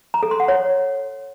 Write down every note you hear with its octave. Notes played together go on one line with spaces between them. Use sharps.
A#5
A4
C6
F#5
C#5